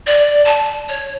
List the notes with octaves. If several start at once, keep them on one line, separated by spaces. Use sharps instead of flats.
D5
A5
C#5